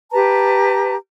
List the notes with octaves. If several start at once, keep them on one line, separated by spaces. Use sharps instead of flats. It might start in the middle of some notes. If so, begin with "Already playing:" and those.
G4 B4 A5 A#5